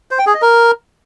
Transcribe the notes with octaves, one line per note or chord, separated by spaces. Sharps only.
C5
G5
G#4
D#5
A#4